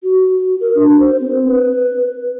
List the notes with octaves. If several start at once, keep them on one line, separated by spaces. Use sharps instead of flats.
F#4
A#4
D4
C5
C4
B4